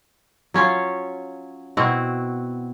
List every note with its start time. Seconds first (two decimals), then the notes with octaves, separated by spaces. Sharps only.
0.54 F#3 C#4 F4 C#5
1.77 B2 C4 E4 F#4